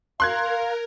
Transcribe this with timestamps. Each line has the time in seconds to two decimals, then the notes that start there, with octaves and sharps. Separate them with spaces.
0.20 A#4 F5 C6 F#6 G#6